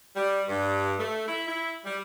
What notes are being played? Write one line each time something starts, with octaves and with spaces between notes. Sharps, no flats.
G3
G2
A3
E4
E4
G3